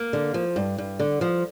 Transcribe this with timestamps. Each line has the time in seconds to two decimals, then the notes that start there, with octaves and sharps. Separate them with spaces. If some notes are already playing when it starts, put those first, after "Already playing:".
Already playing: A#3
0.13 D3
0.34 F3
0.56 G2
0.78 G2
1.00 D3
1.21 F3